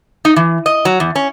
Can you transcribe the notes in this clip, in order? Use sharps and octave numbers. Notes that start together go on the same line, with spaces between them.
D#4
E3
D#5
F#3
E2
C#4